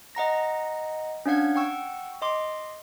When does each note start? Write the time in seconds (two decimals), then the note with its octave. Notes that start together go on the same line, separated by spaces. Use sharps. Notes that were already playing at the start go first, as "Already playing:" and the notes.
0.15 D#5 F#5 A#5 A#6
1.26 C#4 D4 F5 F#5 G#6
1.55 F#5 G5 C#6 E6
2.22 D#5 C6 D6